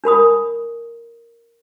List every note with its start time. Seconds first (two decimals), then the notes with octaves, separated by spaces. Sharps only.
0.04 D4 A#4 B5 D#6